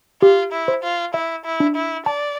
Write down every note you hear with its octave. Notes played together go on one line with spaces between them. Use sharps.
F4 G4
E4
C5
F4
E4 E5
E4
D4
E4
D5 A5